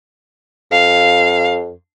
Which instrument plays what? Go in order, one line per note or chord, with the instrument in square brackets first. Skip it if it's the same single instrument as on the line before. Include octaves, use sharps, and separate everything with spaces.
[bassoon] F2 [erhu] F5